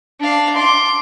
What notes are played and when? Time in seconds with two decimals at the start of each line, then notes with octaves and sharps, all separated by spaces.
0.20 D4 F5
0.56 C6 D6